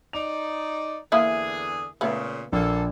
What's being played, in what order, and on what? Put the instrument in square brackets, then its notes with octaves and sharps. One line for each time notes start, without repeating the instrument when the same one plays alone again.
[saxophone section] D#4 D5 [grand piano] F7
[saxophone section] E2 D3 G#4 [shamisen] A#3 E4 E5
[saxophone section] A#2 C#3 [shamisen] A3 B3
[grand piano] A#1 [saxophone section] A#3 A4